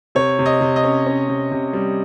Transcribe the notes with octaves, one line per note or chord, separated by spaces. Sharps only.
C3 C#5
C3
D#5
C3
D#5
C#4
C#4
C3
C3
G3